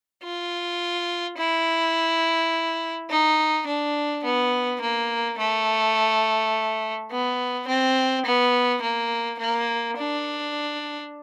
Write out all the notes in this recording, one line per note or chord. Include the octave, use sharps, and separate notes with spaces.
F4
E4
D#4
D4
B3
A#3
A3
B3
C4
B3
A#3
A#3
D4